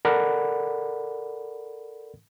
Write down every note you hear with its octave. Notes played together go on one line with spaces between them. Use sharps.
A4 A#4 D5 F#5 B5